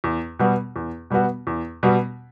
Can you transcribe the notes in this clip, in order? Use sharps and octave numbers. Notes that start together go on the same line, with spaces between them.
E2
B2 G3 B3 F#4
E2
B2 G3 B3 F#4
E2
B2 G3 B3 F#4